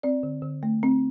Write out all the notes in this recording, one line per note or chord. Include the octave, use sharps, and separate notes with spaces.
C4 D5
D3
D3
A3
C4